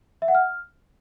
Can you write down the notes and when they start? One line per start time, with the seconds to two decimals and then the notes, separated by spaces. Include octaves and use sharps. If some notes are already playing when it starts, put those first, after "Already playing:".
0.22 E5
0.28 F#5
0.35 F6